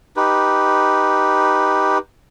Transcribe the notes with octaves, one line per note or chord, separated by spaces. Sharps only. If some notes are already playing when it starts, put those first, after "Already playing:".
D#4 G4 B4